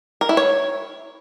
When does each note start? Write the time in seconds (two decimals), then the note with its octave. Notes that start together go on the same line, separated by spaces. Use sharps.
0.21 A#4
0.29 E4
0.37 C#5